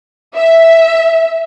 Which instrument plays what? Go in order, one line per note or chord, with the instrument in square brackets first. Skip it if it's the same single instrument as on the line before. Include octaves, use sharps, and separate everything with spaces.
[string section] E5